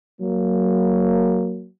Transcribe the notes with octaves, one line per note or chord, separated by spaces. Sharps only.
F#3 A#3